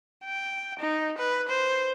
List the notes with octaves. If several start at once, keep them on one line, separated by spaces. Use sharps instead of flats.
G5
D#4
B4
C5